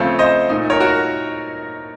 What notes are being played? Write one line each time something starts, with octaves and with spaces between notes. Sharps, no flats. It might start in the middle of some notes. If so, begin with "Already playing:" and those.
Already playing: C#3 F3 A3 C4 C#5
C5 D#5
A#2 A3 D#4
A#4 C#5
F#4 A#4